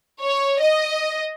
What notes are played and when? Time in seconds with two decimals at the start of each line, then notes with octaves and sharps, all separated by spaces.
0.22 C#5
0.61 D#5